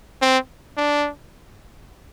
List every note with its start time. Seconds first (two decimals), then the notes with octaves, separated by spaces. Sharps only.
0.22 C4
0.77 D4